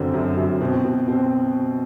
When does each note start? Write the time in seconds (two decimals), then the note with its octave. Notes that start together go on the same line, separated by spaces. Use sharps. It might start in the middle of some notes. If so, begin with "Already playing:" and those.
Already playing: F#2 D3 C4
0.14 F#2
0.37 F#2
0.61 B2 C4
0.85 B2
1.08 B2 C4